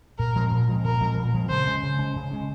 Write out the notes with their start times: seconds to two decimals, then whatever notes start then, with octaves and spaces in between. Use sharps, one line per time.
0.18 A#2 A#4
0.35 F3 G#3 C4
0.51 A#2
0.69 F3 G#3 C4
0.84 A#2 A#4
1.01 F3 G#3 C4
1.17 A#2
1.33 F3 G#3 C4
1.50 C#3 C5
1.67 G#3 C#4
1.83 C#3
1.98 G#3 C#4
2.16 C#3
2.31 G#3 C#4